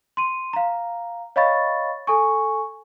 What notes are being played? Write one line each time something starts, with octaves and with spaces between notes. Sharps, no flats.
C6 D#7
F5 A#5
C#5 D#5 F5 B5 C#6 A6
A4 G#5 C#6